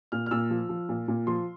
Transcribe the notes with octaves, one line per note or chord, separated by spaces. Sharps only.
A#2 F6
F6
A#2 E6
F3
F3
A#2
A#2
F3 C6